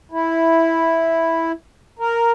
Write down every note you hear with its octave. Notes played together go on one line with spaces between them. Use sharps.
E4
A#4